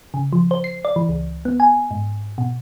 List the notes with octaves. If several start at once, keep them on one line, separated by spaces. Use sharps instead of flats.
C#3
F3
C5
C7
D5
E3
C#2
B3
G#5
G#2
B2